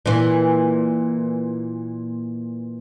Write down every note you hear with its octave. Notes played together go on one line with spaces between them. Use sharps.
A#2 E3